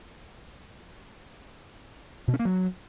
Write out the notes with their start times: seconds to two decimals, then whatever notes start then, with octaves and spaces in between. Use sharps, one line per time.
2.28 B2
2.34 C#4
2.39 A#3
2.45 F#3